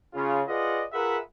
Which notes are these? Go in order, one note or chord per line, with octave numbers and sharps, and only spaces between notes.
C#3 F4
F4 G#4 B4 D5 D#5 F#5
F4 G#4 A#4 B4 E5 F#5